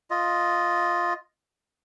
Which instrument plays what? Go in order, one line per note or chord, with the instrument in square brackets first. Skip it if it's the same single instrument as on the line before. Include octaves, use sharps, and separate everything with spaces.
[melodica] F4 D#5